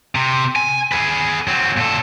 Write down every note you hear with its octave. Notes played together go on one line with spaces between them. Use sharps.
C3
G#5
G#4 B4
F#3 C4
A#2 A4